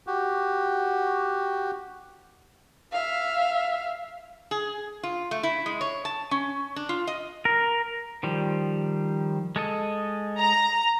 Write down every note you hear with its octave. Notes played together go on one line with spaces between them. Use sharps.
F#4 G4
E5 F5
G#4
F4
A3
E4
G#3
C#5
A5
C#4
D4
F4
D#5
A#4
D#3 F3 G3
G#3 A4 D#5
A#5